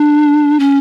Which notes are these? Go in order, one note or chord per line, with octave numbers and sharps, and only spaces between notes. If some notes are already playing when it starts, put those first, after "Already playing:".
Already playing: D4
C#4